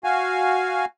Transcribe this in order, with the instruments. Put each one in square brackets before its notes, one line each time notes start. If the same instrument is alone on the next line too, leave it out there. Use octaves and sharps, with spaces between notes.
[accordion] F#4 F5 G#5